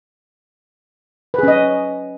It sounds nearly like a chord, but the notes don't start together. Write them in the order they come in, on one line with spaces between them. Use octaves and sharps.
B4 G#4 C#4 D#5